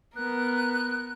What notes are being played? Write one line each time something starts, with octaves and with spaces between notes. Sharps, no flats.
B3 A#4 F#6